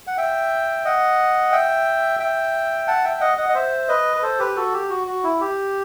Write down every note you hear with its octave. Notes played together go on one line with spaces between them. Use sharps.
F#5
E5 G5
D#5 F#5
E5 G5
E5 G5
F#5 A5
E5 G5
D#5 F#5
D#5 F#5
D#5
C5 E5
B4 D#5
B4
A4 C5
G4 B4
F#4 A4
G4
F#4
F#4
E4
G4